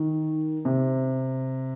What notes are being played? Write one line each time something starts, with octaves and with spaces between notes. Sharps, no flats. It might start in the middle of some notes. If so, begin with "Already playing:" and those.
Already playing: D#3
C3